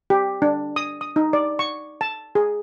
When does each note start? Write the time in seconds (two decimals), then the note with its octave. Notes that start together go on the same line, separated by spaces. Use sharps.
0.10 G4
0.42 D4
0.76 D#6
1.01 D#6
1.16 D#4
1.33 D5
1.59 C#6
2.01 A5
2.35 G#4